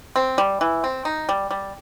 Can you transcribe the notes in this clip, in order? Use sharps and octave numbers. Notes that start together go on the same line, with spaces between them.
C4
G3
E3
C4
D#4
G3
G3